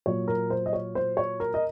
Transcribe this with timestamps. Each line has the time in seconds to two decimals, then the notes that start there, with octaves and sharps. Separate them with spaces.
0.06 A#2 F#3 C#5
0.28 A#4
0.50 C5
0.66 D#5
0.73 C#5
0.95 C5
1.17 C#5
1.40 A#4
1.54 D#5